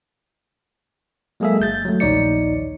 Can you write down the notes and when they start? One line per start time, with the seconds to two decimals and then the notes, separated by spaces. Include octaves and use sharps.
1.40 F#3 G#3 A#3 G#4 A4 E5
1.60 G1 G6 A6
1.85 F#3 A3
2.00 A#1 D#2 D#4 C#5 D5 C#7